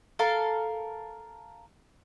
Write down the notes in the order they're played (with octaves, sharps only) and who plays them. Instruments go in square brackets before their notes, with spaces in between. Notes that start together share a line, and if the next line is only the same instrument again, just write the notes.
[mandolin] A4 A#4 F5